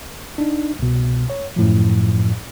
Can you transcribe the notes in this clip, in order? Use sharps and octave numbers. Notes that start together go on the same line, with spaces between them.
D4 D#4
C2 B2
C#5
F#2 A2 F3